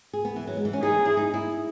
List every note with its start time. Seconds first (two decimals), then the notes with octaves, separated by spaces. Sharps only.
0.13 G#4
0.25 B3
0.36 E3
0.47 F#3
0.57 G#3
0.65 E3
0.73 C#4
0.82 D#4 G#4
1.05 E4
1.17 D#4
1.34 E4